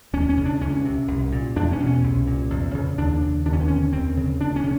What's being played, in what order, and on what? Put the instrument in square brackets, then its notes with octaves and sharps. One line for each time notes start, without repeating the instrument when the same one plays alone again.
[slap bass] D#2 C#4
C#4
C#3
D4
C#2 C#4
C3
C2
A#2
E2 D4
C#4
B2
C#4
C2
A#2
E2
C#3
D#2 D4
C#3
D#2 D4
C#4
C4
D3 C#4
D#2 C4
C#3
D2 D4
C#4
C#3